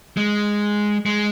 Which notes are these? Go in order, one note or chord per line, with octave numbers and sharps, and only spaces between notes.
G#3
G#3